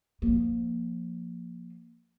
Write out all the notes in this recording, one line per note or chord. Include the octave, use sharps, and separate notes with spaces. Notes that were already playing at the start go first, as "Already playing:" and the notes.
F3 A#3